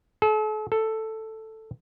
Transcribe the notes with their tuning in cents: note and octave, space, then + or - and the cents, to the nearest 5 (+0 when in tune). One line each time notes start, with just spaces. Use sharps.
A4 -40
A4 +5